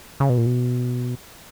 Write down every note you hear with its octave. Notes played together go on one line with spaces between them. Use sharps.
C#3
B2
A#2
B2